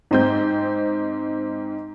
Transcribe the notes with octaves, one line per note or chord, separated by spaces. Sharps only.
G#2 C4 G6